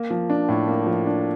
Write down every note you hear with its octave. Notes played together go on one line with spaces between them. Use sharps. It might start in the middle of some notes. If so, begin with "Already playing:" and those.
Already playing: A#3
F3
D4
A2
A#3
F3
D4